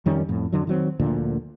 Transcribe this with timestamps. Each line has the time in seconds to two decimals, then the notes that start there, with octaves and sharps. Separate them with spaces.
0.06 F2 D#3 G3 C#4
0.28 F2 A2
0.52 F2 D3 F#3
0.67 D#3 F#3 C4
1.00 D2 A#2 D3 F3